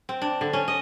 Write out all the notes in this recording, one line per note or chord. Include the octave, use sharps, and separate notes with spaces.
C4
D4
D3
C#4
D#5